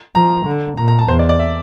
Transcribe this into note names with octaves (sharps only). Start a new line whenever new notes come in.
F3 A#5
D3
A#2 A#5
A#5
A5
E2 C5
D5
D5
E5